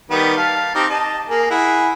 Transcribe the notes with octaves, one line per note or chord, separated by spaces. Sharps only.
D#3 G3 B3
F5 A5
C4 D#4 G4
D#5 A5
A#3 G#4 A#4
E4 G#4 F#5